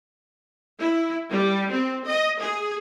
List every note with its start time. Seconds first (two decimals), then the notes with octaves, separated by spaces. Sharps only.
0.80 E4
1.31 G3
1.70 C4
2.07 D#5
2.41 G#4